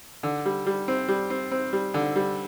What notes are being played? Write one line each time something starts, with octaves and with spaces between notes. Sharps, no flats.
D3
G3
G3
C4
G3
C4
C4
G3
D3
G3